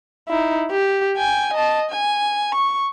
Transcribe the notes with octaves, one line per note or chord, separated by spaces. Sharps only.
D#4 E4
G4
G5 G#5
D#5 A5
G#5
C#6